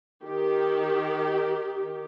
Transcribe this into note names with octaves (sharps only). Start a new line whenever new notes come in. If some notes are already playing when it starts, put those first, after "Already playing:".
D#3 G4